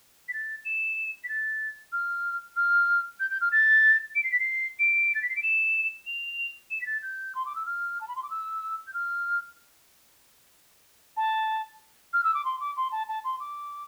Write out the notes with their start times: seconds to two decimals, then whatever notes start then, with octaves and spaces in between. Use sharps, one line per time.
0.28 B6
0.33 A6
0.65 E7
1.24 B6
1.29 A6
1.92 F6
2.56 F6
3.20 G6
3.31 G6
3.41 F6
3.52 A6
4.16 D7
4.24 C7
4.32 B6
4.40 C7
4.79 D7
5.15 A6
5.22 B6
5.30 C7
5.36 D7
5.43 E7
6.07 F7
6.71 E7
6.81 B6
6.86 A6
7.03 G6
7.35 C6
7.46 D6
7.56 E6
7.66 F6
8.01 A5
8.08 B5
8.16 C6
8.23 D6
8.31 E6
8.87 G6
8.94 F6
11.17 A5
12.13 F6
12.24 E6
12.34 D6
12.45 C6
12.60 D6
12.77 C6
12.92 A5
13.08 A5
13.25 C6
13.40 D6